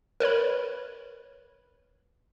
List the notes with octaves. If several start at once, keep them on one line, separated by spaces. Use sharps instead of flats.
A#4 B4 C#5 B5